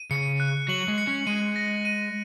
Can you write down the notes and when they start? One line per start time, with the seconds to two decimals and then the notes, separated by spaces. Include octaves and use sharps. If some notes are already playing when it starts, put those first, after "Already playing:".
Already playing: D#7
0.11 C#3 C#7
0.40 F#6
0.68 F#3 F#7
0.88 G#3
0.98 C#7
1.07 C#4
1.27 G#3 D#7
1.56 A#6
1.85 D#7